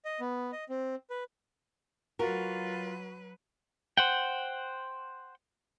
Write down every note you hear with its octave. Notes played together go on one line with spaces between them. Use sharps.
D#5
B3
D#5
C4
B4
F#3 F4 F#4 A#4 B4
C5 F#5 G5